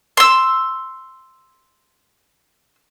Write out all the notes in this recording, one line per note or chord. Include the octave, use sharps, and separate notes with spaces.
C6 E6